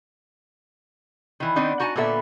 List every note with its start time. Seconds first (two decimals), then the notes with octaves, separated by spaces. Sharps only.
1.40 D#3 E3
1.56 D#3 B3 C4 D4 D#4
1.80 D#4 F#4 G#5 A5
1.96 A#2 D3 B3 A4 E5